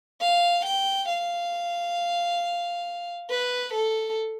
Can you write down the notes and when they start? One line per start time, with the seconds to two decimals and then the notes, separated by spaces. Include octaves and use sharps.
0.21 F5
0.65 G5
1.09 F5
3.30 B4
3.74 A4